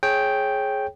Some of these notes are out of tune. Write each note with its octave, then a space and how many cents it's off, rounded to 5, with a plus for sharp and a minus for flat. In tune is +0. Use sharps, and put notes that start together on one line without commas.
G#4 +20 C#5 -20 G5 +0